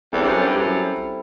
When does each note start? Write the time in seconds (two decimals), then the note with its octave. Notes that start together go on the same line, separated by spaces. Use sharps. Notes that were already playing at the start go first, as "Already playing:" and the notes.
0.13 E2 G3 C4 E4 A4
0.21 G2
0.28 F#2
0.42 G2
0.57 F#2 G3 C4 E4 A4